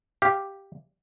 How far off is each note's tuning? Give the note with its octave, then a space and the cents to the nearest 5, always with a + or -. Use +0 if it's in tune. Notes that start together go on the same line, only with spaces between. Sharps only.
G4 +0 F5 +0